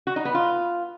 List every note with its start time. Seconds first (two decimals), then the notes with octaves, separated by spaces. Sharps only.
0.07 F#4
0.16 D#4
0.25 B3
0.35 F4